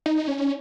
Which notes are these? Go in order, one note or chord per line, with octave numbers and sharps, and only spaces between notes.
D#4
C#4